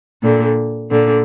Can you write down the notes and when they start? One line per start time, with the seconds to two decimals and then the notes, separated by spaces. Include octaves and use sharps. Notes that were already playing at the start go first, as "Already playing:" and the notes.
0.23 A#2 D3
0.90 A#2 D3